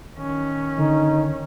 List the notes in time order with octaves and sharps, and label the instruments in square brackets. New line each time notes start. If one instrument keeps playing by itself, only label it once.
[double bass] D#3 C#4
[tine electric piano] D3 [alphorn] D#4